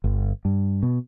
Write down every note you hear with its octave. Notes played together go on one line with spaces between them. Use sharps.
G1
G2
B2